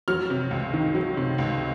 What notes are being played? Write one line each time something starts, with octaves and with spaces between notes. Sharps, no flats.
F#3 F6
C3
C#2
D#3
F#3
C3
C#2